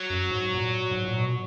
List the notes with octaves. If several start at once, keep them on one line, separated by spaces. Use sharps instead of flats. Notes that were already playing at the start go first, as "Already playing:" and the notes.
Already playing: F#3
F#2
G#2
A#2
G#2
A#2
B2